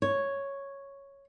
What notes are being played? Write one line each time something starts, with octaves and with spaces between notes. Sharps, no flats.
C#5